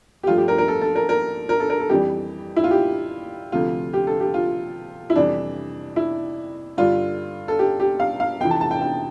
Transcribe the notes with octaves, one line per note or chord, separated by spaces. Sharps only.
G4
G2 F3 A3 F4
G4
A#4
A#4
A4
A4
A#4
A#4
A#4
A4
A#4
A4
F2 E3 G3 G4
E4
F4
G4
D2 C3 F3 A3 F4
G4
A4
G4
F4
E4
F2 C3 E3 G3 D4
E4
G2 D3 G3 F4
A4
G4
G4
F5
F5
F2 C3 E3 G5
A5
A5
G5
G5